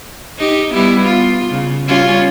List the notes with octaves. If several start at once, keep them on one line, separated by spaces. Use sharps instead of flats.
D#4 G4
G3 B3 E4
F4
C#3
G3 C#4 F4